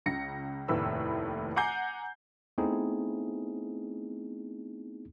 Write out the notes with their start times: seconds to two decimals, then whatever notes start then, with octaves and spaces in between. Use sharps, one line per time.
0.06 C#2 C#3 A#6 C#7
0.68 F1 D#2 A2 B4 E6
1.56 F#5 G#5 A#5 D6 G6 C7
2.58 A3 B3 C4 D#4 E4 G#4